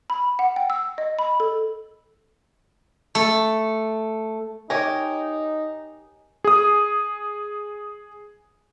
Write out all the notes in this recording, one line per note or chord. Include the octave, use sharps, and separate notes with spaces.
B5
F#5
G5
E6
D#5
B5
A4
A3
D#4 G4 A#4 C#5 D#5 G#5
G#4 D#6